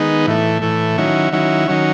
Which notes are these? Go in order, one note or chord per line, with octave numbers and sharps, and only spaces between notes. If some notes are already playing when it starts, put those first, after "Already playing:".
Already playing: D#3 G#3 B3 D#4
A2 E3 A3
A2 E3 A3
D#3 F#3 C#4 E4
D#3 F#3 C#4 E4
D#3 F#3 C#4